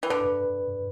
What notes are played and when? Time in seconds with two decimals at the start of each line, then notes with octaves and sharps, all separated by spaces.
0.03 E3
0.10 D3 B4
0.28 B4